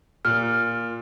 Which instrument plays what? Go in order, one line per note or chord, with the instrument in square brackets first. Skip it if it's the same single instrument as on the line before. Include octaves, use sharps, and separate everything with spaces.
[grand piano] A#2 [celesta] F6